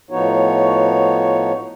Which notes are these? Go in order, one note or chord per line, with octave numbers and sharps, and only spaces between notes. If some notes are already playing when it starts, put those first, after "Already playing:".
A2 F3 B3 D#4 F#4 C#5